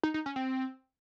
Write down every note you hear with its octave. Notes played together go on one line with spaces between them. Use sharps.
D#4
D#4
C#4
C4